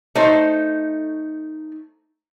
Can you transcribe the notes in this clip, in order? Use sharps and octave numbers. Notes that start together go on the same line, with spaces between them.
A3 D#4 C5